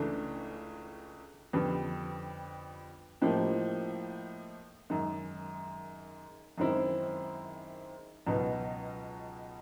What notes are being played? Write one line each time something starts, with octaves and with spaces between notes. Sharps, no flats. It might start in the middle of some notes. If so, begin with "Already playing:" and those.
Already playing: C#2 C#3 E3 A3 D4
F2 D3 G3 B3
A2 F3 A#3 D#4 G4
F#2 D#3 G#3
F#2 D#3 G#3 C4 E4
C#2 B2 F#3 B3 D#4